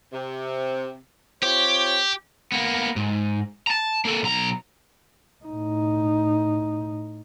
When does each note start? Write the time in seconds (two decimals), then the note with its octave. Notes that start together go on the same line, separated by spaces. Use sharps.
0.13 C3
1.43 C4 F4 G4 C#5
2.52 A#3 B3
2.96 G#2
3.67 A5 A#5
4.05 A#3 A4
4.23 B1 A#5
5.45 A2 D#4